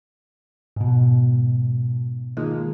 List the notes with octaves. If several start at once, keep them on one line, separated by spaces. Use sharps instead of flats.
G#2 B2
D#3 F3 G#3 A#3